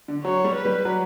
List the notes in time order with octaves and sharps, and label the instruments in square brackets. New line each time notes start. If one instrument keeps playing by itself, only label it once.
[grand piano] D3
[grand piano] F#3 [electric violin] C#5
[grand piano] G3
[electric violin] B4
[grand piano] G3
F#3